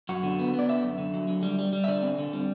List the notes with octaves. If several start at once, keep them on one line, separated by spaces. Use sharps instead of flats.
F#2 F#4
D3
B3
B3
D5
D3 E5
F#2
D3
F#3
D3
G3
G3
G3
E5
D3 D5
C4
D3
G3